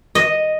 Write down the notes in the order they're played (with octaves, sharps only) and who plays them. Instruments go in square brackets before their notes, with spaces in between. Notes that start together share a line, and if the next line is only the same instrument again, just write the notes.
[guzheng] D#5